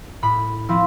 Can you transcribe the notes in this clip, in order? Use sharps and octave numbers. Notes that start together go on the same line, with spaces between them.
A2 B5
F3 C4 E4